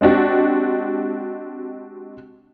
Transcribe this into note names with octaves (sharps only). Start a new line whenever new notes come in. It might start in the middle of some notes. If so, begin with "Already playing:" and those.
G#3 C4 D4 F#4 G4